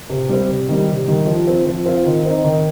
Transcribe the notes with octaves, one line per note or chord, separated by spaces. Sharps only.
C3
G3 C4
C3
D#3 G3
C3
D#3 G3
F3
C4 F4
F3
C4 F4
D#3
C4 D#4
D#3